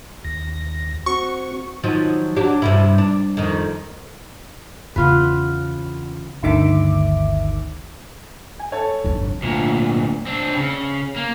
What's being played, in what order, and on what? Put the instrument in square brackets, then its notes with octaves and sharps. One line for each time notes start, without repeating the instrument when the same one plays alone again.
[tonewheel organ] D#2 A#6
[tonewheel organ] C4 F#4 [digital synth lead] C#6
[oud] D#3 F3 F#3
F#3 D4 G4
G2 C3 E4
D4
F2 D#3
[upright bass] E2 C#3 [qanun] B3 F4 B4
[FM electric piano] G1 D2 D#3 E5 D6
[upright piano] G#5
A4 C#5 A5
[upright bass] G1 F2
[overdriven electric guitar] D2 A#2
C4 D4
C#3
A#3